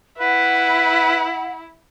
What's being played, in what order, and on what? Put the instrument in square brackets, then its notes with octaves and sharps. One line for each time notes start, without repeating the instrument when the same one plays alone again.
[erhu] E4 [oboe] B4 [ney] F#5